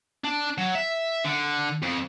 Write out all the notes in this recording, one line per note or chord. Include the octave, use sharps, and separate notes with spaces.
D4
F#3
E5
D3
F2